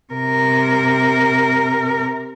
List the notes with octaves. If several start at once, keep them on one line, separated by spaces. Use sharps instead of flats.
C3 A#4